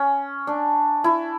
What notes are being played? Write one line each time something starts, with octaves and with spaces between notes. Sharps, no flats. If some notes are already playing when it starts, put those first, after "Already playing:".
Already playing: C#4
D4
E4